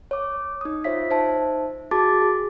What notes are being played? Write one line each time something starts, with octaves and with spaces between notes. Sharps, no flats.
C#5 D6
D#4 D#6
F4 C5 C#5 E5 B6
D#4 C5 E5 A5
F#4 G#4 A5 D6 A6
G#4